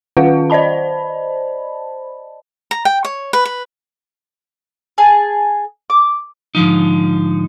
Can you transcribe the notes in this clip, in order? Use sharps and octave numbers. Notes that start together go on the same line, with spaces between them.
D#3 C#4 F4 B4 F5 F#5
C5 D5 D#5 A5 B5
A#5
G5
C#5
B4
B4
G#4 A5
D6
G#2 D3 F3 D#4